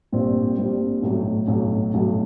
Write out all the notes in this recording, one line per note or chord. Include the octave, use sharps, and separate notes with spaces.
A#1 A#2 G3 C4
A#1 A#2 G3 C4
B1 A2 F#3
B1 A2 F#3
B1 A2 F#3